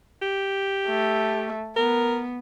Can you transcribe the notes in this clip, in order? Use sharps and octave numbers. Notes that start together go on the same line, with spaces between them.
G4
A3
B3 A#4